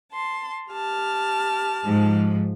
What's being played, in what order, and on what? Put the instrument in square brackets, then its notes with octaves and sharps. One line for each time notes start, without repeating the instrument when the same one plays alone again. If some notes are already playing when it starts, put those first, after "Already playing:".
[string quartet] A5 C6
G4 A5 F6
[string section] G#2 F3